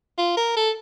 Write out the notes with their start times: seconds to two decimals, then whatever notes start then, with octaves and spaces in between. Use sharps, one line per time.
0.18 F4
0.37 A#4
0.56 A4